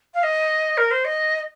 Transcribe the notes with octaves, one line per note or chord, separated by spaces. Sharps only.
F5
D#5
A#4
C5
D#5